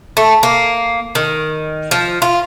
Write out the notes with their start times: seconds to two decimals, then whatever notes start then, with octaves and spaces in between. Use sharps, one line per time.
0.17 A3
0.43 A#3
1.15 D#3
1.91 F3
2.22 F4